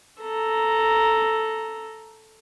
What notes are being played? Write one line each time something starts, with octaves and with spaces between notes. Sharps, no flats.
A4 A#5